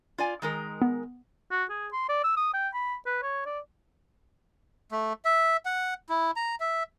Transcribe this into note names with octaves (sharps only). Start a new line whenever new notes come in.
F4 D5 G#5
D#3 G#3 A#4
B3
F#4
G#4
C6
D5
E6
D#6
G5
B5
B4
C#5
D5
A3
E5
F#5
E4
A#5
E5